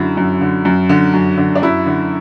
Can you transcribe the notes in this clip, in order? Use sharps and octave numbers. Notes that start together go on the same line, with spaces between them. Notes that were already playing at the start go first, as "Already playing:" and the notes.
Already playing: F#2 D3 E4
F#2
D3
F#2
D3
F#2
D3
D4
F#2 E4
D3